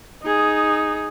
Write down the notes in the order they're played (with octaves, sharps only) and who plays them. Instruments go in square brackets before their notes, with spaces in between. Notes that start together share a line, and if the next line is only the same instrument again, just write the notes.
[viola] D#4 G#4